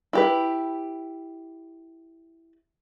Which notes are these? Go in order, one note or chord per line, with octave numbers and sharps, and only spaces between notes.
E4 G4 B4